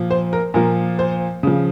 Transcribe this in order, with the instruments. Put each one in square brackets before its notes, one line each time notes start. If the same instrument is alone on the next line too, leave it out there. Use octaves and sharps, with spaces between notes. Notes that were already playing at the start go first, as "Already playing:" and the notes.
Already playing: [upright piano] A#2 F3
C5
A#4
A#2 F3 A#4
C5
C#3 F3